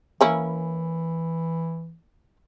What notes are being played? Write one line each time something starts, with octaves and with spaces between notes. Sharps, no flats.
E3 A#3 C#4 E4